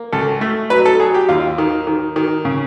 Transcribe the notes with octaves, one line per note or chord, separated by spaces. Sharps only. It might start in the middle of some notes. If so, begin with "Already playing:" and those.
Already playing: A#3
C#2 A4
A3
F#3 B4
A4
F#3 G#4
G4
D#2 F4
D#3
D#3
D#3
C#3